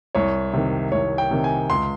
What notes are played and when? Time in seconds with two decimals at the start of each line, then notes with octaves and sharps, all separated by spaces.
0.15 C2 C#5
0.53 C3 D#3
0.92 C2 C#5
1.18 G5
1.31 C3 D#3
1.44 G#5
1.70 C#2 C6